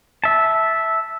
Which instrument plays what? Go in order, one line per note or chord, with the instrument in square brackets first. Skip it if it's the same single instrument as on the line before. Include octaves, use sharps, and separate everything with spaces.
[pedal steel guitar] E5 A5